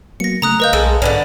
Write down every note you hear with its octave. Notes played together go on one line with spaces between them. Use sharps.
F#3 A#3 B3 A#6 C#7
C#3 A3 A#5 D#6 F#6
A#4 B4 D#5 F5 G6
B1 G#3 A4 E6
G#2 D3 B3 C#4